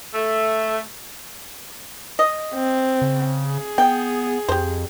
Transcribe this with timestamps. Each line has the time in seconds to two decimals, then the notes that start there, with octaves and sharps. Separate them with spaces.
0.14 A3
2.19 D#5
2.54 C4
3.02 C#3
3.48 G#4
3.78 B3 G5
4.49 F2 G4 C5